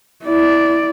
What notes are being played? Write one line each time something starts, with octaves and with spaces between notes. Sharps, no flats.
E4 D5